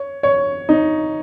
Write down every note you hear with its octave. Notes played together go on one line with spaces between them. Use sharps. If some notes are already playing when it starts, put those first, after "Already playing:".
Already playing: C#5
C#5
D#4